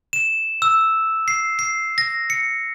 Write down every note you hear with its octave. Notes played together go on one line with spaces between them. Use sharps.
E7
E6
C7
C7
A#6
C#7